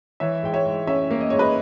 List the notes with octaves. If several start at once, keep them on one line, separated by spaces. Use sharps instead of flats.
E3 C#5 E5
G#2 G5
C#5 E5
G#2
C#4 C#5 E5
A#3
D#5
G#2 C#5
B4 D#5